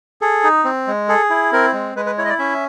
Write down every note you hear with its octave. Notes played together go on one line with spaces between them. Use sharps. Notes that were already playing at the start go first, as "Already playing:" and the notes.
G#4 A4
D#4
C4
G#3
G#4 A4
E4
C4 A#4
G#3
G#3 B4
B4
E4 C#5
D#5
D5
C#4 E5